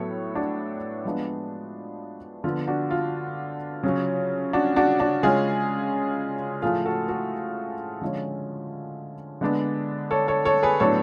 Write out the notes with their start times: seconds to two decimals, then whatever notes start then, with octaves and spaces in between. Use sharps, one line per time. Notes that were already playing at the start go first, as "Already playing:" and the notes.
Already playing: A2 F#3 B3 A4 C#5
0.35 D4 F#4
1.05 F3 G#3 B3 D4
2.44 D3 F3 B3 F4
2.67 D4 F#4
2.91 F4
3.83 C#3 F#3 C#4
4.53 D4 F#4
4.76 D4 F#4
5.00 D4 F#4
5.23 C#3 G#3 C#4 F4 G#4
6.62 A2 F3 A3 F4 G#4
6.85 F#4 A4
7.09 F#4 A4
8.01 D3 F3 G#3 C#4
9.41 D3 G#3 B3 D4
10.11 A4 C#5
10.28 A4 C#5
10.45 A4 C#5
10.63 G#4 B4
10.80 A2 F#3 B3 D4 A4 C#5